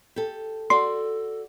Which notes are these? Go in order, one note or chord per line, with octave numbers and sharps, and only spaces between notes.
G4 A4
F#4 A4 D5 C6